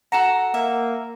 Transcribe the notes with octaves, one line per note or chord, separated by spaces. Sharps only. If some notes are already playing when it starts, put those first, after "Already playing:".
F#4 A4 F#5 A#5 C#7 E7
A#3 E5